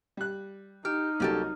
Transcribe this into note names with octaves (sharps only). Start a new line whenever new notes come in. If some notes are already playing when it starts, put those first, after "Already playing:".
G3 F#6
D#4 G4 F6
C2 F#3 A#3 C#4 G4 A4